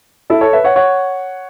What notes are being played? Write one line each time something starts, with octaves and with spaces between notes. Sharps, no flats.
E4 A4
A4 C#5
B4 E5
C#5 F#5
C#5 F#5